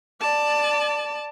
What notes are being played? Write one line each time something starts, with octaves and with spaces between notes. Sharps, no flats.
D5 A5